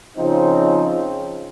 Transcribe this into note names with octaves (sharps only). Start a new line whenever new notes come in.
C#3 F3 C4 D#4